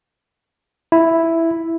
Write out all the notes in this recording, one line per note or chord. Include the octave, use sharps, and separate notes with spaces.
E4